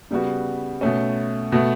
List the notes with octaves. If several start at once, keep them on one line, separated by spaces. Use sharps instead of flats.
C#3 G3 B3 F#4
B2 A3 C#4
B2 A3